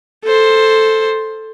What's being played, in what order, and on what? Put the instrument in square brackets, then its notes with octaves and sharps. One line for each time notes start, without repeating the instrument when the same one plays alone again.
[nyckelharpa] A4 C5